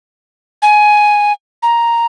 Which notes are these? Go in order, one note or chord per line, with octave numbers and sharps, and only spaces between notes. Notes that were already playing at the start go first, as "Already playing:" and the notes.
G#5
A#5